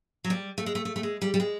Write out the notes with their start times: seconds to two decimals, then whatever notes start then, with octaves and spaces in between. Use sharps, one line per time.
0.24 F#3
0.30 G3
0.58 A3
0.66 G#3
0.75 A3
0.85 A3
0.96 A3
1.03 G#3
1.22 G3
1.34 G3
1.40 G#3